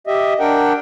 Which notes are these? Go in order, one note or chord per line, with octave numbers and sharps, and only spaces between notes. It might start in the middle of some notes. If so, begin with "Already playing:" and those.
G4 D#5 E5
D4 A#4 F#5 G5